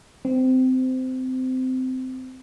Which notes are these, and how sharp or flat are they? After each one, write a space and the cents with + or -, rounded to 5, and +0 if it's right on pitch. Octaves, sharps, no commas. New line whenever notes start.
C4 -20